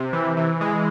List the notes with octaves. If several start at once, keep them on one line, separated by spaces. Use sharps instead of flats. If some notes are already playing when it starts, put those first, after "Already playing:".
Already playing: C3
E3
E3
G#3